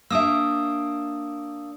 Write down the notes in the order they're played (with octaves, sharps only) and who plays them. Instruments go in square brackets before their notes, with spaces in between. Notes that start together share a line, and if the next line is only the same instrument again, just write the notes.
[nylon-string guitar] A#3 D4 E5 [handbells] D#6 E6